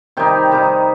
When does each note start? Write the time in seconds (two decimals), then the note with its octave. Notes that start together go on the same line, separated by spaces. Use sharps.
0.17 C3 D#3 G3 D#4 G5
0.51 C3 D#3 G3 D#4